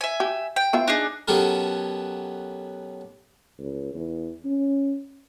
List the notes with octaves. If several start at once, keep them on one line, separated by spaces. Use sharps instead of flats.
E5 G#5
G4
G5
B3 F4 E5
D4 D#4 G#4
B2 F#3 C#4 G4 A4 A#4
C#2
E2
C#4